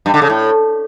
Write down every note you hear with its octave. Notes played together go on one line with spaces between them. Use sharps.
G2
D3
C#3
A2